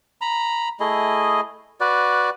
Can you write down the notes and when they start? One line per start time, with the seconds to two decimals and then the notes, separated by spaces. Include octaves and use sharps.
0.21 A#5 B5
0.80 A3 E4 G#4 D#5
1.81 F#4 B4 D5